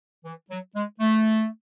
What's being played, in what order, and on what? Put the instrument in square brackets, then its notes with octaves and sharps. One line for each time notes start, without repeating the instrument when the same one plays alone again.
[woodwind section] E3
F#3
G#3
A3